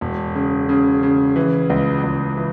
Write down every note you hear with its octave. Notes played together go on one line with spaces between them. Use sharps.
E1
C#3
C#3
C#3
E3
C#2
C#2
E3